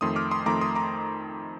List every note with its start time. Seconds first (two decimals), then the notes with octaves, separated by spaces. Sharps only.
0.01 F2 D#3 A3 C6 D#6
0.16 D6 F6
0.31 C6 D#6
0.46 F2 D#3 A3 A#5 D6
0.61 C6 D#6
0.75 A#5 D6